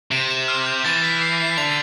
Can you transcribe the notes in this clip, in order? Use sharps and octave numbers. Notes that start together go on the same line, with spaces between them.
C3 D7
E7
F6
G6
E3 A6
B6
C7
C7
D3 F7